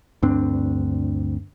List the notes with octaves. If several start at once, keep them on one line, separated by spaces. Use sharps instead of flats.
D2 G2 C4 D4